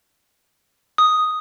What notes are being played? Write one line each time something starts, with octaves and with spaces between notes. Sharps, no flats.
D#6